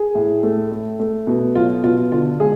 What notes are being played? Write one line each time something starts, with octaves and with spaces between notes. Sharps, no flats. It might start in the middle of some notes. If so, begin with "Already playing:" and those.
Already playing: G#4
A2
A3
A3
A3
B2
F#3 F4
B2 F4
D3 F4
G#3 G#4